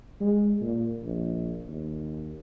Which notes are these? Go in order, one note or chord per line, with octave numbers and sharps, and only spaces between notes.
G#3
A#2
A#1
D#2